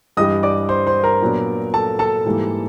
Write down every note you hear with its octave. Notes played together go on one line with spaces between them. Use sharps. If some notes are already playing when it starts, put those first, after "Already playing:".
G2 E3 G3 D#5 D#6
D5 D6
C5 C6
C5 C6
A#4 A#5
A#2 F#3 B3 D4
A4 A5
A4 A5
G#2 E3 G3 A#3